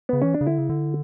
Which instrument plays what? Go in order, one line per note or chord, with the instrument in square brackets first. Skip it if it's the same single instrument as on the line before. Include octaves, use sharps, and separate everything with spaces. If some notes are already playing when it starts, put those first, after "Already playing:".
[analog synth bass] C#3 [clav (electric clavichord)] B3
[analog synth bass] E3 [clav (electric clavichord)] C#4
[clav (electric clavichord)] D4
[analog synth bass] C#3
[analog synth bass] D3 [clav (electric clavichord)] E4
[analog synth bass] C#3
D3